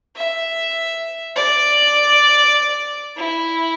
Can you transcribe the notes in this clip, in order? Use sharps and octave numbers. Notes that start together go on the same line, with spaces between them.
E5
D5
E4